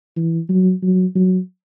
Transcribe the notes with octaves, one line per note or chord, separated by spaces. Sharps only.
E3
F#3
F#3
F#3